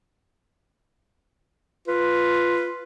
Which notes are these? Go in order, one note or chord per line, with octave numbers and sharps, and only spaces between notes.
F4 B4